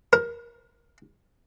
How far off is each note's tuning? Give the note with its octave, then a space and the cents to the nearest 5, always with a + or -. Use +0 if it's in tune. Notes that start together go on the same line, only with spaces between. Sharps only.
A#4 +20